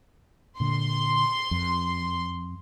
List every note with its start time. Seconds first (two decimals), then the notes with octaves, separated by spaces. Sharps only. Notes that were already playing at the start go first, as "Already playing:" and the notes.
0.60 A#2 D3 C6
1.51 F2